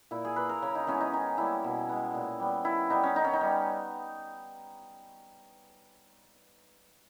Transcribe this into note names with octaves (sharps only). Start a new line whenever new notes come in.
A#2 E4
G#4
A#3 B4
A#4
C#3 C#4
D#4
E3 G#3 B3 C#4
D#4
D#3 D#4
G3 A#3 E4
B2
G#3 B3
A#2
G3 B3
D#3 E4
G3 B3 D#4
C#4
D#3 D#4
C#4
D#4
G3 B3